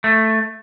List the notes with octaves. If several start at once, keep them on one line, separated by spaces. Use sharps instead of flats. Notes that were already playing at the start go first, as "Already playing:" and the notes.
A3